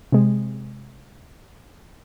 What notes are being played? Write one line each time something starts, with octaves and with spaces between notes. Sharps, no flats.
C3 G#3